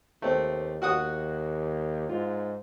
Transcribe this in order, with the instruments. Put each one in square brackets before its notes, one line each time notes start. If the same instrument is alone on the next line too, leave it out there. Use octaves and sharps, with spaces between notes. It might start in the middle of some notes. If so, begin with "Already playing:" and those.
[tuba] D#2 [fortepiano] A3 C4
[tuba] D#2 [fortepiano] F#4 F#5 D#6
[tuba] G#2 [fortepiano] F4